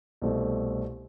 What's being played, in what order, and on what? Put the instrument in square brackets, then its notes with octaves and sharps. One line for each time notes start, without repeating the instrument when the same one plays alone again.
[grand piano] C2 B2 A3 C4